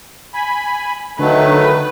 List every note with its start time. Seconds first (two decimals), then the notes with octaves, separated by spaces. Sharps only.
0.34 G#5 B5
1.19 D3 D#3 F#3 A3 B4